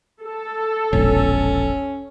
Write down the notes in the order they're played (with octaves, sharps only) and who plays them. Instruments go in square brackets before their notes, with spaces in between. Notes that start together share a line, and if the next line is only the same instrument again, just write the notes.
[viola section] A4
[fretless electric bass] E1 A#1 [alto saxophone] C#4